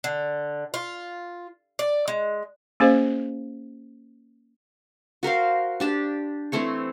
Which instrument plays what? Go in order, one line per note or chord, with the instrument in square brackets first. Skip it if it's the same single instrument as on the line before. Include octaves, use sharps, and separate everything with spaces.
[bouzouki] D3
F4
D5
G#3
[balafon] A#3 C#4 G#4 C5 D#5 F5
[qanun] F#4 A#4 C5 F5
D4 G4 A5
E3 A3 C4 C#5